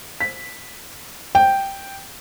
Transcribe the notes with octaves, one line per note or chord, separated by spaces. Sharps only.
B6
G5